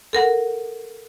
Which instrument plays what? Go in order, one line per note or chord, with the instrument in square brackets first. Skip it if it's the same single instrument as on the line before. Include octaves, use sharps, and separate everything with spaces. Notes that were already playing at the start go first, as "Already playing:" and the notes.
[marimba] A4 A#4 F#5